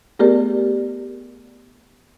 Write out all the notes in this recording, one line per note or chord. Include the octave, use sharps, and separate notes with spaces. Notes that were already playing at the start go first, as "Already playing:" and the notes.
A3 B3 G4 G#4 A#4 D5